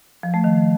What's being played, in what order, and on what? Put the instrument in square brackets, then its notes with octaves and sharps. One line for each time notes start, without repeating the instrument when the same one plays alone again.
[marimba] F3
A3
D#3